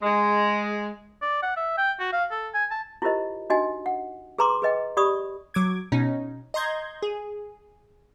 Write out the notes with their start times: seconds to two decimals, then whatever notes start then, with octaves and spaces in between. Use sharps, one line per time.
0.02 G#3
1.22 D5
1.43 F#5
1.57 E5
1.78 G5
2.00 F#4
2.13 F5
2.31 A4
2.54 G#5
2.71 A5
3.02 E4 F4 G4 A#4 C5 D#5
3.50 D4 D#4 F#4 D#5 G#5
3.86 F#5
4.39 G#4 B4 A#5 C6 D6
4.62 G#4 B4 D#5 G5
4.97 G4 D5 B5 C#6 D#6
5.54 F#3 D6 G#6
5.92 B2 C#4 D#4
6.54 D#5 A#5 C6 G6 G#6
7.02 G#4